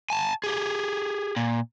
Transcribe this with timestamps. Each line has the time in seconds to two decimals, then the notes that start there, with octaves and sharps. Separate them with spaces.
0.10 G#5 A5
0.44 G4 G#4
1.36 A#2